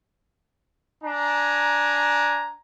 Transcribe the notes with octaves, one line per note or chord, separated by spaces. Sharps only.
D4 G#5 A#5